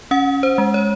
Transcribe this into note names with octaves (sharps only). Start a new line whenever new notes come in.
C#4 F#5
C5
G#3
C#5